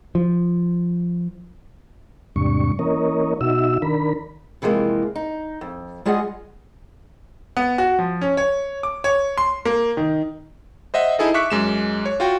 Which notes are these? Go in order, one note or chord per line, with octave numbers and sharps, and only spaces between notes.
F3
E2 G#2 C3 G3 D4 C#6
E3 A#3 C#4 A#4 C#5 D#5
B2 D#4 F#4 E5 E6
D#3 D4 A#4 B5
C3 E3 F3 G#3 A#3
D#4
F2
G3 G#3 F4 G#4 D#5 F#5
B3
F#4
F3
C#4
C#5
D6
C#5
C6
A#3
D#3
C5 D#5 E5 F#5
D#4 E4 G#4 A4 D#5
E5 C#6 D6 F#6 B6 C#7
F#2 G#3 E7
C#5
F4 F#4 G5